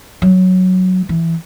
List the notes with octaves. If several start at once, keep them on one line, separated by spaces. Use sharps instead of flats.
F#3
E3